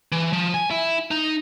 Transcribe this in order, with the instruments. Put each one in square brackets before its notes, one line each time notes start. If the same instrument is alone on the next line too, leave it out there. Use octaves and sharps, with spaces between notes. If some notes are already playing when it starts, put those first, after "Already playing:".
[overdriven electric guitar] E3
F3
G#5
E4
D#4